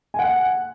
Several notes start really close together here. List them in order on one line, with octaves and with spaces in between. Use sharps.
G#5 F#5 F#6